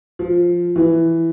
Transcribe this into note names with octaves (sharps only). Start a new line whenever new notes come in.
F3
E3